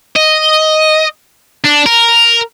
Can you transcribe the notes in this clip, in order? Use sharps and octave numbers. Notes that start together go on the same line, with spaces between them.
D#5
D4
A#4